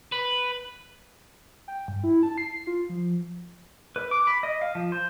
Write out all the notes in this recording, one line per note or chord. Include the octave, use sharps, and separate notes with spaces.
B4
G5
G2
E4
A5
C7
F4
F3
B4
D6
B5
D#5
F5
F3
C5